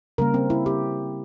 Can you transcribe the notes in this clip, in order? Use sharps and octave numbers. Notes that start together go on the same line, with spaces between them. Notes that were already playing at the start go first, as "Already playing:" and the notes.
C#3 G3 A#3 A#4
C4
E4
G4